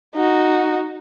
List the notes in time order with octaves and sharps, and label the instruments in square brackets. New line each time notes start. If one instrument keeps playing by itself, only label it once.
[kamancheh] D#4 F#4